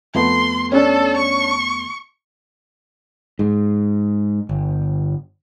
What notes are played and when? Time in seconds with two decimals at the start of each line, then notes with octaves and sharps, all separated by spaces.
0.15 F2 A3 B3 C6
0.72 C#4 D4 A4
1.16 C#6
3.39 G#2
4.49 G1